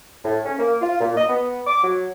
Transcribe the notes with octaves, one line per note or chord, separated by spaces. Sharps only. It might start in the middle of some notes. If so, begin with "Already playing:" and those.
A2
C#4
A#3
F4
A#2
D#5
B3
D6
F#3